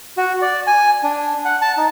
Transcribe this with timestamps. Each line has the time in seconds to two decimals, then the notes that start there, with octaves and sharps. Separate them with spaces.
0.17 F#4
0.42 D5
0.67 G#5
1.03 D4
1.45 F#5
1.62 A5
1.77 D#4